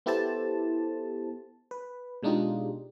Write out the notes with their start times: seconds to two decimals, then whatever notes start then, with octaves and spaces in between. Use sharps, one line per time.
0.06 B3 E4 G4 A4 C5 A5
1.71 B4
2.23 B2 G#3 D4 D#4 F4 G4